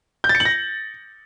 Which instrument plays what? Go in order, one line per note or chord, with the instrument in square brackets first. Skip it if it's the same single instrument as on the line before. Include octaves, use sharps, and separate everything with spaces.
[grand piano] G6
A6
C#7
F#7
A#6